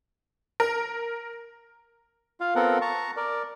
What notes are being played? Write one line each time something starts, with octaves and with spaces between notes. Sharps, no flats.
A#4
F4 F5
B3 C4 F4 A4 A#4 F#5
A5 A#5 C#6
A#4 D5